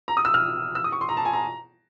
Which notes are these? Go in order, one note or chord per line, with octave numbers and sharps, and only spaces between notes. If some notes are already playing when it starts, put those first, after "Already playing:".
A#5
D#6
E6
F6
E6
D#6
C#6
C6
A#5
A5
G#5
A#5